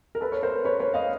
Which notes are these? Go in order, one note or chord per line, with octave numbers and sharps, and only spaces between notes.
A#4
A4 B4
C#5
A#4 C5
B4 C#5
B4 C#5
D#5 F5